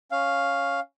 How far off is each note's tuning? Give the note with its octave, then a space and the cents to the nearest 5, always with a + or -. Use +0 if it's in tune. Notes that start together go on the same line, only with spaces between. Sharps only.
C#4 +0 F5 +0